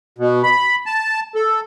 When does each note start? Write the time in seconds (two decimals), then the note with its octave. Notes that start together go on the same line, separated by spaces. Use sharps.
0.18 B2
0.43 B5
0.86 A5
1.35 A4